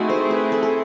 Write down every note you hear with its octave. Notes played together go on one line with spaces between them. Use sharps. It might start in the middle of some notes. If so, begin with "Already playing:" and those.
Already playing: A3 C4 D#4 E4 F#4 G#4
C5
B4
A4
A4